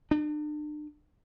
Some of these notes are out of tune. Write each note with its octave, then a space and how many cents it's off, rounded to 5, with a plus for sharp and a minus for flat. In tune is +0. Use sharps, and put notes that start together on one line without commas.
D4 +40